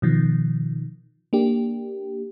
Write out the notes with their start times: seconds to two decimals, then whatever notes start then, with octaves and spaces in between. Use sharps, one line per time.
0.02 B2 D#3 F3
1.33 A#3 D4 G4